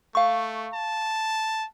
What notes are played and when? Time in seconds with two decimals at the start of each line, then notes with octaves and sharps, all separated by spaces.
0.15 A3 F5 C#6
0.74 A5